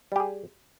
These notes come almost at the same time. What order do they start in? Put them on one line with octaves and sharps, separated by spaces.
G3 G4 G#4